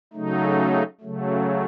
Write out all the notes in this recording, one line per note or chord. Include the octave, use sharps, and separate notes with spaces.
C#3 F#3 A3 D#4
C#3 F#3 A3